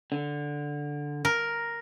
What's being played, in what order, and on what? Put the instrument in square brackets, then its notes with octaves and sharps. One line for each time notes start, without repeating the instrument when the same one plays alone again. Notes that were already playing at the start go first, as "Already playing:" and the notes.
[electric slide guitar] D3
[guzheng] A#4